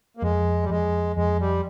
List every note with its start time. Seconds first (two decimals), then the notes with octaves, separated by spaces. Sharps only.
0.17 A#3
0.22 F2 G#3
0.63 G3
0.70 F2 G#3
1.16 F2 G#3
1.40 G3